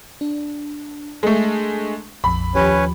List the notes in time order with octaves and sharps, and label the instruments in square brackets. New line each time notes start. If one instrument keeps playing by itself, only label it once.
[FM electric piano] D4
[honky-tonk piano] G#3 A3
[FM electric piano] A#1 F2 [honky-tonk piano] B5
[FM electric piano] D#2 F3 G4 [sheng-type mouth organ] C#4 B4 C#5